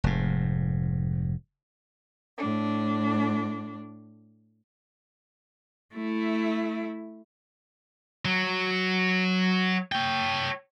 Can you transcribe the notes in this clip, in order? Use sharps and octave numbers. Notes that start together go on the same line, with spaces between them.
F1 G#2
A2 D4
A3 E4
F#3
C#5 G5